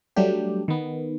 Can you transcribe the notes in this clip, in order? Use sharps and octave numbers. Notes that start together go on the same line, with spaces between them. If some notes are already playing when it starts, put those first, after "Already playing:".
F#3 G3 A3 D4 G4
D#3 B3